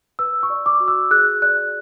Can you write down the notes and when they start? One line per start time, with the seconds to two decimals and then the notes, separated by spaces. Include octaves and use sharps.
0.19 B4 E6
0.43 C#6
0.50 D5
0.66 D6
0.80 F#4
0.88 E6
1.11 G#4 F#6
1.42 D5 F#6